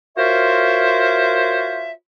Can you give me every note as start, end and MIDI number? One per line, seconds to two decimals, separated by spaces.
0.18 1.92 65
0.18 1.92 66
0.18 1.92 70
0.18 1.92 72
0.18 1.92 73
0.18 1.92 76